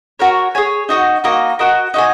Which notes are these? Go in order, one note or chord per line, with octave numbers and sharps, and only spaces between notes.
F#4 A#4 C#5
G#4 C#5 G#5
D#4 F#4 D#5
A#3 D#4 F#4 D#5
F#4 A#4 D#5
D#4 F#4 D#5 G#5